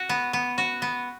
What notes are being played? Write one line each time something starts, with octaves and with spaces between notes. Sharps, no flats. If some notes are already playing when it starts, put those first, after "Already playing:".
Already playing: F#4
B3
B3
F#4
B3